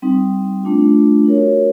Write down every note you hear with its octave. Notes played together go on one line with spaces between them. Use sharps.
G3 C4 D#4
A3 D4 F4
D#4 F#4 A#4 C#5